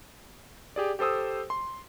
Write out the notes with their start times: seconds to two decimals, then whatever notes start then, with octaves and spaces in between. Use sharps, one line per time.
0.76 G4 G#4 D5
0.99 G4 A4 C5 D#6 E6
1.50 C6